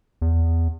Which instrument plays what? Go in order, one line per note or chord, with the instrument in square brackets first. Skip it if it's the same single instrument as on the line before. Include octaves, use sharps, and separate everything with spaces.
[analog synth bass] E2